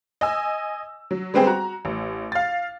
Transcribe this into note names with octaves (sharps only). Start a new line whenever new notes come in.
D#5 G#5 E6
F#3
G3 G#3 B3 C4 G4 G#4
F#4 A#5
A1
F5 A6